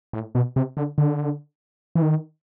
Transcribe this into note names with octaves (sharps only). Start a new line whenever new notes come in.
A2
B2
C3
D3
D3
E3
D#3